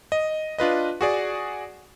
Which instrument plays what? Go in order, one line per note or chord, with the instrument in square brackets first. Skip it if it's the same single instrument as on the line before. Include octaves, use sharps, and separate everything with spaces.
[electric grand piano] D#5
D4 F4 B4 D#5
F#4 G#4 D5